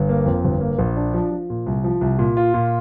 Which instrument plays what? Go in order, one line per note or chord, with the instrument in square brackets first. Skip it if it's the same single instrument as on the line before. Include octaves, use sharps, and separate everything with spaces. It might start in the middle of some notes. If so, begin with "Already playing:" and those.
Already playing: [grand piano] G1
A#3
F2
G1
A#3
A#1
D4
F3
F3
A#2
C2
F3
C2
A#2
F4
A#2